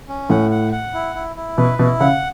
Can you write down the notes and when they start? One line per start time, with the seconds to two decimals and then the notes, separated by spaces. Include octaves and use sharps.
0.09 C#4
0.30 A2 F#5
0.51 F#5
0.72 F#5
0.94 E4
1.15 E4
1.36 E4
1.57 B2 B4
1.79 B2 E4
2.00 C#3 F#5